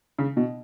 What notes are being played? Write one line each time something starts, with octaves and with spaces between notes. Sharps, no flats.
C#3
B2